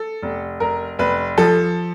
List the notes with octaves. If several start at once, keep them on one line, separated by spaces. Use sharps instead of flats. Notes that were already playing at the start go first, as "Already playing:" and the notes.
Already playing: A4
F1
F1 A#4
F1 B4
F3 A4